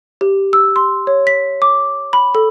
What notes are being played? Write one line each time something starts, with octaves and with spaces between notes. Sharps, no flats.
G4
E6
C6
C#5
B6
D6
B5
A4